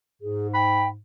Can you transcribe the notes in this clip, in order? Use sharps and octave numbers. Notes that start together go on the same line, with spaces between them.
G#2 G#4
G5 B5